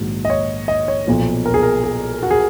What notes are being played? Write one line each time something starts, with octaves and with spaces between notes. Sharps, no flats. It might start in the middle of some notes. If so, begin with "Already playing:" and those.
Already playing: A#1 G#2 D#3 F#3
D#5
C#5
D#5
C#5
B1 A#2 F3
A#4
G#4
A#4
G#4
F#4
G#4